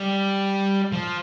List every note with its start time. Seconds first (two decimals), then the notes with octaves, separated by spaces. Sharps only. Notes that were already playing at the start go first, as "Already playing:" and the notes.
Already playing: G3
0.92 F3